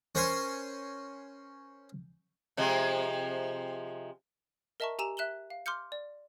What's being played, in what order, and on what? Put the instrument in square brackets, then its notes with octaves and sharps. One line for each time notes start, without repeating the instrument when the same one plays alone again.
[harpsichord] C#4 A#4 C5 G#5 C6
[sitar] C3 F3 G#3
[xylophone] A#4 D#5 E5 A5 A#5 C#6
G4 G#5 A#5 E6 E7 F7
E5 F#6 E7 F#7 G7
F5
C6 D6 F6 G6 C#7
D5